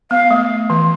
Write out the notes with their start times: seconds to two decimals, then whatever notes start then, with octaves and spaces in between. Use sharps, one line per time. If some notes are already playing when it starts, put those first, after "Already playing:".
0.11 B3 F5
0.31 A3
0.70 E3